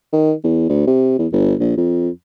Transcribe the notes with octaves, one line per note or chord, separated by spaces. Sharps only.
D#3
E2
D2
C3
E2
G1
A#1
F2